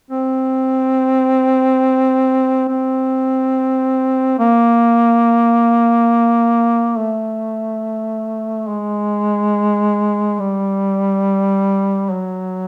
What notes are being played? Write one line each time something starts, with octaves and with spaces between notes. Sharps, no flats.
C4
C4
A#3
A3
G#3
G3
F#3